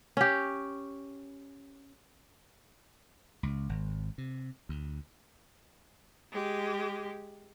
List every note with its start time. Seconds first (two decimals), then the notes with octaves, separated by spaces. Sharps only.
0.17 C#4 G4
3.43 C#2
3.69 G#1
4.18 C3
4.69 D2
6.32 G#3 G4